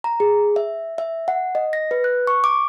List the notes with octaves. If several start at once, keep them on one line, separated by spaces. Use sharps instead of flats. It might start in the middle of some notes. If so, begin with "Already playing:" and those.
A#5
G#4
E5
E5
F#5
D#5
A#6
B4
F#6
C#6
D6